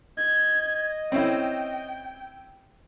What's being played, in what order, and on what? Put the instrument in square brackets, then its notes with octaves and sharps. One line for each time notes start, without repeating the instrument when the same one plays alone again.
[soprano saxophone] D#5 [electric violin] G#6
[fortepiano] C4 C#4 E4 [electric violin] G5